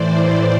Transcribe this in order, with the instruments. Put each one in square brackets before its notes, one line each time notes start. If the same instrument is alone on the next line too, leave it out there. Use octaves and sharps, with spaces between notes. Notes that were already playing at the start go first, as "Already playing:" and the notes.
Already playing: [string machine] A2 E3 C5 D5